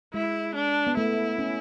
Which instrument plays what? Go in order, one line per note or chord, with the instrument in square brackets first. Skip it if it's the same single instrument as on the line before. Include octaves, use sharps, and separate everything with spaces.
[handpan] G#3 [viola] E4
[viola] D4
[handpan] B3
[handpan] A3 [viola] E4
[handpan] C#4